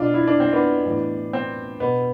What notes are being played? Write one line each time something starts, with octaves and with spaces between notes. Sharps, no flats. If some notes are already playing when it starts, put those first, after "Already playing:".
Already playing: B2 D4 F4
E4
D4
C4
B3 D4
A2 E3
C4
B2 B3